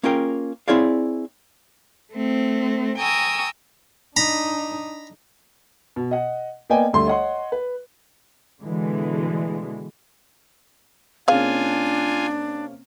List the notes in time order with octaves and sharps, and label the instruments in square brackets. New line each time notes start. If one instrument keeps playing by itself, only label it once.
[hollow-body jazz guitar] A#3 C#4 F4 G#4 A#4 G5
C4 E4 G#4 C#5 D5 F5
[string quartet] A3 C4
G5 G#5 A#5 C#6 D#6 E6
[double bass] D4 D#4 [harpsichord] A#5 B5
[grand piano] B2
D#5 F#5
A#3 B3 D5 D#5 G5 G#5
D2 G3 A3 C6
C#5 D#5 F#5 C6
B4
[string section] B2 D3 E3 G#3
[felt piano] C3 A#3 C#4 [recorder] D4 [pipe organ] F4 G#5 [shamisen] G#4 F5